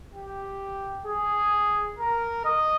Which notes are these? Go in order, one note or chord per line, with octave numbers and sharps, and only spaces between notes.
G4
G#4
A#4
D#5